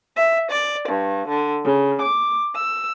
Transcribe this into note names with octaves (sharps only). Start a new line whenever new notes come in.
E5
D5
G2
D3
C#3
D6
E6